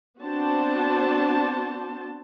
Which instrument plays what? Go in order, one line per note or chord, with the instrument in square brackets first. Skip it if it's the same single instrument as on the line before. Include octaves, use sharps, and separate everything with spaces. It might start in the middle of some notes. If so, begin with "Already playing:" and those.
[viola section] B3 C4 D4 F#4 C5 A5